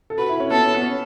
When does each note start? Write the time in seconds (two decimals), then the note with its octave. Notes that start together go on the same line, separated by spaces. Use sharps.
0.10 A4
0.18 F#4 B4
0.29 E4
0.40 C#4
0.50 B3 A4
0.59 C#4
0.75 B3
0.83 C#4